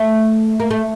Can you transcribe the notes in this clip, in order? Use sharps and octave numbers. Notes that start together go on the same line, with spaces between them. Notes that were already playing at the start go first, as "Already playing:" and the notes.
Already playing: A3
A#3
A3